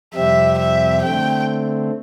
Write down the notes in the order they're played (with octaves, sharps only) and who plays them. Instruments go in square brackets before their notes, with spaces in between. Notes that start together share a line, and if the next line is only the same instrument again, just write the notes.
[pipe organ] F2 C3 G3 C4 G4 [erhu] E5
[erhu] E5
[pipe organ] D3 A3 C4 [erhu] G5